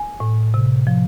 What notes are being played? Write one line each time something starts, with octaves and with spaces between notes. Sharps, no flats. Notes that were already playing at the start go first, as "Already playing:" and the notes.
Already playing: G#5
A2
C3
F3